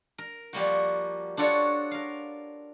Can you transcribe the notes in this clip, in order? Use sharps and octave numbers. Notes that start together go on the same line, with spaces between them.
A#4
F3 G3 A#3 F#4
D4 F4 F#4 A4 C#5
A#4 F5